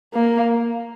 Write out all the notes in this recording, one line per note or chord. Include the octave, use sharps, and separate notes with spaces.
A#3